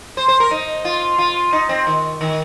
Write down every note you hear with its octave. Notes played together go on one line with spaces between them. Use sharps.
C5
C5
A#4
D#4
F4
F4
D#4
C4
D#3
D#3